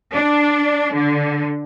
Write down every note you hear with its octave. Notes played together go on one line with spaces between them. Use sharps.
D4
D3